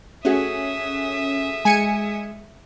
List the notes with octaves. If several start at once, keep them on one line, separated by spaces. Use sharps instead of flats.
A3 C#4 F#4 G#4 E5 D#6
G#3 G#5 C#7 D#7